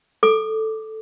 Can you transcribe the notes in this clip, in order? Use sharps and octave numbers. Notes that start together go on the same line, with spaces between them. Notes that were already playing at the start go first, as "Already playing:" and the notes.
A4 D6